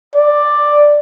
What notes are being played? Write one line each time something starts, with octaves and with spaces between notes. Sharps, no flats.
D5